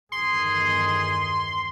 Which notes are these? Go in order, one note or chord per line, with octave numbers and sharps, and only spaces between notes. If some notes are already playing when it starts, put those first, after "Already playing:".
G1 E2 D#3 G#4 C6